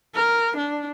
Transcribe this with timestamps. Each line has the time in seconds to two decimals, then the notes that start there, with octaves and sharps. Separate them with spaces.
0.15 A#4
0.57 D4